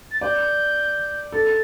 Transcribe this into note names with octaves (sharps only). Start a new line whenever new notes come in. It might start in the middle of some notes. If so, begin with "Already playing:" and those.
A6
D5 G6
A4 A6